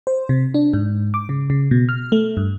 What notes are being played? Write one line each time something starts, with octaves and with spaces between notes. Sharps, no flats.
C5
C3
D4
G#2
D6
C#3
C#3
B2
F6
A3
G2